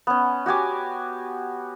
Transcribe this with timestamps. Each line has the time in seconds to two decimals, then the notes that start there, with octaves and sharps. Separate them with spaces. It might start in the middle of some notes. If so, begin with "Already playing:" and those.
0.07 B3 C#4
0.46 F#4 G4 G#5 D6